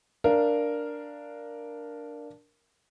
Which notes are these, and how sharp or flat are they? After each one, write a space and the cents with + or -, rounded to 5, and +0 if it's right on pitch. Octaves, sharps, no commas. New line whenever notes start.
D4 +0 A#4 +0 F5 -15